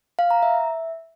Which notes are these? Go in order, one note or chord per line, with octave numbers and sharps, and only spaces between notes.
F5
A#5
E5